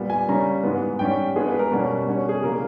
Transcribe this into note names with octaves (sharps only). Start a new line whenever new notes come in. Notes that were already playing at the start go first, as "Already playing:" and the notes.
Already playing: A#2 G3 B3
G#5
C#3 G3 C#4 A#5
G#2 E3 G#3 B3
G#2 G3 C#4 G5
G2 E3 G#3 B3 G#4
B4
A#4
B2 G3 A#3 C#4
B2 G3 C#4
G#4
C#3 E3 G3 A#3 A#4